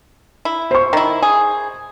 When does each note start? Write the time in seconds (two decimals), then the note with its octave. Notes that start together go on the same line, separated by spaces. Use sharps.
0.45 E4
0.71 C5 C#6
0.93 D#3 E4
1.22 G#4